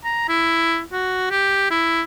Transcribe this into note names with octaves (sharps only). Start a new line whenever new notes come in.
A#5
E4
F#4
G4
E4